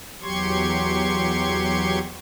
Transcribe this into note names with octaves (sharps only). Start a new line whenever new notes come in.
E2 F#3 G4 C6 C#6 G#6